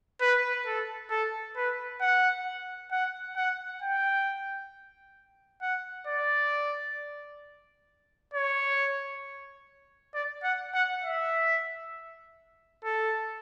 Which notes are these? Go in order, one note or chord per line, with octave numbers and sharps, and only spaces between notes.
B4
A4
A4
B4
F#5
F#5
F#5
G5
F#5
D5
C#5
D5
F#5
F#5
E5
A4